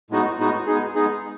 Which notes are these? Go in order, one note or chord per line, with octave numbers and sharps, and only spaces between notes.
A2 G#3 B3 D#4 F#4
A2 G#3 B3 D#4 F#4
G#3 B3 D#4 G#4
G#3 B3 D#4 G#4